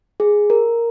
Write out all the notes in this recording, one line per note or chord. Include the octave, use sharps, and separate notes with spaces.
G#4
A#4